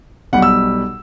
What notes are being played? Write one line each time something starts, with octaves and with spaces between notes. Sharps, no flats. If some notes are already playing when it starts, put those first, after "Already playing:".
B1 B2 G3 F#5
E6